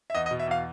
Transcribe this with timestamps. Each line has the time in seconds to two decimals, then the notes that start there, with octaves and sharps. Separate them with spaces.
0.10 E5
0.15 E2 D#5
0.26 D#5
0.31 B2
0.39 E5
0.47 E2 F5